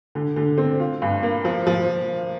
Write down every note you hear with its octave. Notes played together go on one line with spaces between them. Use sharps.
D3
D3
C4
F4
G2
A#3
F3
F3